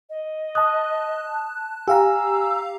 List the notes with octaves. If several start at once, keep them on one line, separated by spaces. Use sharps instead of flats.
D#5
A5 D#6 F#6
G4 F5 G#5 A#5 E6